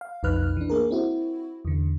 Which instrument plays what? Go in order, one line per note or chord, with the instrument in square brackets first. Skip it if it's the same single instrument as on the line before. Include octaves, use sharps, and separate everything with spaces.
[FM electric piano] F5
B1 F2 D#4 B4 F6 F#6
E3 D4
A#3 G#4 A#4
C4 E4 F#4
E2 D3